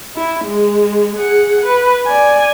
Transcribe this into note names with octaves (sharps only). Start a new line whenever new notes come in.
E4
G#3
G#4 F#5
B4
D5 G#5